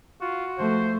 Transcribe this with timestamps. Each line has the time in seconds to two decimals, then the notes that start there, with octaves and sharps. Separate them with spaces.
0.21 F4 F#4
0.58 F3 A3 C5